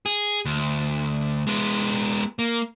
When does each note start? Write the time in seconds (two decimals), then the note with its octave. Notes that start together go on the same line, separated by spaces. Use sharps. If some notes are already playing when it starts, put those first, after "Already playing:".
0.06 G#4
0.45 D2
1.47 G#3 B3
2.39 A#3